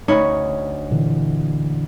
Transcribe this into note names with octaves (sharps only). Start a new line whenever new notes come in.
D2 C#4 D#4 C#5 B5
A#2 D3 E3